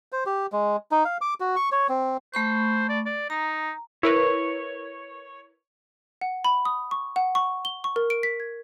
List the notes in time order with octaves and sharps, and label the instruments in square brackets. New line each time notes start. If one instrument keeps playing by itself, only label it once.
[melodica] C5
G4
G#3
D#4
F5
D6
F#4
C#6
C#5
C4
[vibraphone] A3 B5 C#6 [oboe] C5
[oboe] D5
D5
[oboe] D#4 [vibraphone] A#5
[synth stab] E4 A#4 B4 [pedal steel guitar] C#5
[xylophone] F#5
B5
D#6
C#6
F#5
C#6
G7
C#6
A#4
D7
B6
G#6